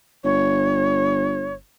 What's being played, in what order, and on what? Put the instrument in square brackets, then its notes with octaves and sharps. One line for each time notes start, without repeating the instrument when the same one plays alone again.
[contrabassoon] G1 [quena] C#5